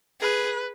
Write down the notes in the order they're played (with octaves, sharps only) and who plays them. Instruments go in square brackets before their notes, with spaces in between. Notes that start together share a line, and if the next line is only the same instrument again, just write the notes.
[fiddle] G#4 [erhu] B4